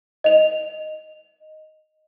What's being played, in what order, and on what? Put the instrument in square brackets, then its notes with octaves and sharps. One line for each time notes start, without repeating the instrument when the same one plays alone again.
[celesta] D#5 F7